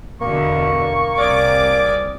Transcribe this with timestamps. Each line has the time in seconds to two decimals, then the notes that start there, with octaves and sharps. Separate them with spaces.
0.21 E2 B2 D3 A#3 C#6
1.19 C2 G#4 A#4 D5 D6